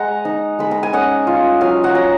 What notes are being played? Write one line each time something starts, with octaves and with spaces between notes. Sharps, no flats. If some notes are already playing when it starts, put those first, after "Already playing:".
Already playing: G#3 F#5 G#5 A#5
D#4
G#3 B5
A#5
G#5
C#4 D#5 F#5
F4
F#3 F5 G#5
F#5 A#5
F#3 A#5